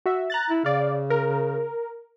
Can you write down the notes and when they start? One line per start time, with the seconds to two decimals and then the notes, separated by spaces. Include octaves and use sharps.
0.06 F#4 E5
0.30 A#5 F#6 A6
0.50 E4
0.65 C#3 D5 F5
1.10 A#4